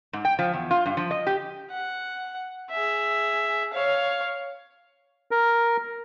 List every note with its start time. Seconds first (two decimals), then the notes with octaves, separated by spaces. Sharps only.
0.13 G#2
0.25 G5
0.39 F3
0.54 E2
0.71 F4
0.86 G2
0.97 F3
1.11 D#5
1.27 G4
1.71 F#5
2.71 G#4 E5
3.73 C#5 F5
5.31 A#4